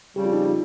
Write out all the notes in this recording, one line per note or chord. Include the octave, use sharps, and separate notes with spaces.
F2 C#3 G3 G4
F4
D#4
F4